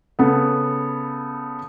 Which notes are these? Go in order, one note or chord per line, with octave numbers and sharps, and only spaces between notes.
C#3 B3 A4